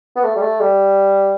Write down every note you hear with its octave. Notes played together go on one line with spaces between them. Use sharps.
B3
A3
G3
A3
G3